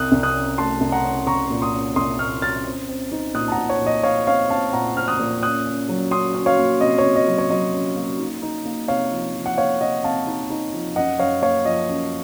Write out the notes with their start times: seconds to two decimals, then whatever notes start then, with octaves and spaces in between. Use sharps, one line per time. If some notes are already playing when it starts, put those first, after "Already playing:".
Already playing: C2 D#6 F#6
0.12 C2
0.23 D#6 F#6
0.34 C#4
0.58 A3 A5 C6
0.81 C2
0.92 F#5 A#5
1.04 C#4
1.26 C2 A#5 C#6
1.50 A#2
1.62 C6 D#6
1.73 C#4
1.96 C2 C6 D#6
2.19 A#2 C#6 F6
2.42 C#4 F6 A6
2.65 C4
2.89 C4
3.12 D#4
3.35 A#2 D#6 F#6
3.48 A5
3.52 F#5 A#5
3.57 A#2
3.69 C#5
3.81 A#2
3.86 D#5
4.03 C4 C#5 F5
4.27 C4 C#5 F5
4.50 C4 F5 A5
4.73 A#2 F#5 A#5
4.97 C4 F6
5.08 D#6 F#6
5.20 A#2
5.42 C#4 D#6 F#6
5.66 C#4
5.89 F#3
6.11 C#4 C6 D#6
6.35 C#4
6.46 C#5 F5
6.58 A#3
6.81 C3 D#5
6.98 C#5
7.04 C3
7.16 D#5
7.27 F#3
7.38 C#5
7.50 F#3 D#5
7.74 C#4
7.96 A#3
8.19 D#4
8.42 D#4
8.65 A#3
8.88 C3 C#5 F5
9.11 F3
9.35 F3
9.46 F#5
9.57 A#3 C#5 F5
9.81 C3 D#5 F#5
10.04 C3 F5 A5
10.27 D#4
10.50 D#4
10.73 F3
10.96 F#2 D#5 F#5
11.19 F#2 C#5 F5
11.42 A#3 C#5 F5
11.65 F3 D#5
11.88 F#2